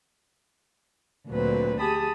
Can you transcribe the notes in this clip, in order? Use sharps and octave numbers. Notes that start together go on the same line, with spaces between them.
D2 A#2 D3 F#3 C4 B4
G4 G#4 A5 B5 D#6